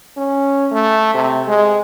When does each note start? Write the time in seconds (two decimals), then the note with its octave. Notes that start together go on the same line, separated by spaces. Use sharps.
0.17 C#4
0.71 A3
1.14 C3
1.47 G#3